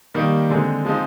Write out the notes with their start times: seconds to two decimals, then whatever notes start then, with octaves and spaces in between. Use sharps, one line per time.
0.14 D#3 G3 A#3 D#4
0.50 D3 G#3 C4 D#4
0.85 F3 G#3 C4 D#4